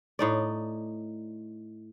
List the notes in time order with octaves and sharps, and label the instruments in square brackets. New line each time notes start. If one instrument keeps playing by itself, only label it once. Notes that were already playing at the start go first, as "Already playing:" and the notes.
[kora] A2 D#4 D5